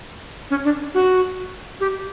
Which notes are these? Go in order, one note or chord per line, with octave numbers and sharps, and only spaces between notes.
C#4
D4
F#4
G4